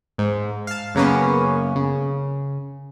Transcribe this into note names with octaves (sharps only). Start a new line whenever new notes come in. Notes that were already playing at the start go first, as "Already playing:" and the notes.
G#2
F5 A5
F#2 C#3 A#3 B3 C#4
C#3